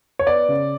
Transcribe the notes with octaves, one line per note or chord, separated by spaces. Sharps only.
C#5
B3 D5
C#3